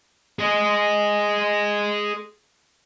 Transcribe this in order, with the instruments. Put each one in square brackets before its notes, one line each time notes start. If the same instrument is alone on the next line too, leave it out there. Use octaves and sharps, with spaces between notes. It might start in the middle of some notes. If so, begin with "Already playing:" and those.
[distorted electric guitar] G#4 D#5